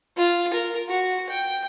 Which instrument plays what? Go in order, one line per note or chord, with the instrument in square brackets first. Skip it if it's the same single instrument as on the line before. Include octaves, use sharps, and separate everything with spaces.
[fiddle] F4
A#4
F#4
G5